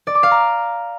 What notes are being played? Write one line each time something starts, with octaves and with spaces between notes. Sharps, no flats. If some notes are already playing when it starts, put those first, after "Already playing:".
D5
D6
F5
A#5